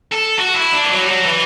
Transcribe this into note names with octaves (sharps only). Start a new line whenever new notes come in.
A4
F#4
E4
D4
E3
F#3
G3
F#3
E3